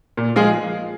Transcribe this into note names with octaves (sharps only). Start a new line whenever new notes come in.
A#2
F3 G#3 F4 G#4